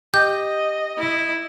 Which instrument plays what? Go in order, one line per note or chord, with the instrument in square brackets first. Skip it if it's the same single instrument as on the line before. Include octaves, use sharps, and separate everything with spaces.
[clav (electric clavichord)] G4 [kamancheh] D#5 [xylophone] G6
[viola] E4